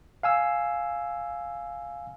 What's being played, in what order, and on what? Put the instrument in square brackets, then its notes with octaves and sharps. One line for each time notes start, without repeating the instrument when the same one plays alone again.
[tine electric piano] F5 G#5 E6